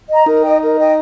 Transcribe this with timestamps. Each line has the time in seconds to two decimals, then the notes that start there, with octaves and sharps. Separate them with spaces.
0.09 D#5 A#5
0.26 D#4 A#4
0.44 D#5 G5
0.61 A#4
0.78 D#5 G5